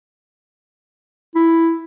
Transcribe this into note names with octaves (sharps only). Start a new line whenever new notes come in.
E4